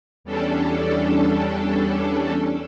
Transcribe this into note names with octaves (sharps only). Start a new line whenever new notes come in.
E2 G3 C#4 D4 A4